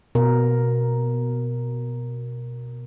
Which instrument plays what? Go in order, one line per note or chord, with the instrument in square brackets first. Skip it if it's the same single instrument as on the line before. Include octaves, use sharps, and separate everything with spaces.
[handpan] B2 A#4